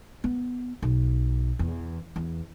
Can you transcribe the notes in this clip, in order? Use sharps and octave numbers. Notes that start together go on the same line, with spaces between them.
B3
B1
E2
E2